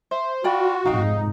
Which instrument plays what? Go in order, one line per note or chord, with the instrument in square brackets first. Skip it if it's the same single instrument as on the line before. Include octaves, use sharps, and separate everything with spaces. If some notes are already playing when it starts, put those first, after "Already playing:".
[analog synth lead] C5 [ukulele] E5
[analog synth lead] F4 [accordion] F#4 [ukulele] D5 G5 B5
[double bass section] F1 G#2 [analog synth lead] D#4 [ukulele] F5 G5